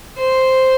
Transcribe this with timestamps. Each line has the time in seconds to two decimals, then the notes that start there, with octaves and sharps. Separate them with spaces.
0.18 C5